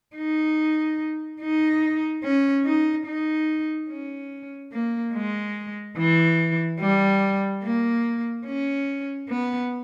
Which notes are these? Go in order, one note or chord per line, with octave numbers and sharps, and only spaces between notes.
D#4
D#4
C#4
D#4
D#4
C#4
A#3
G#3
E3
G3
A#3
C#4
B3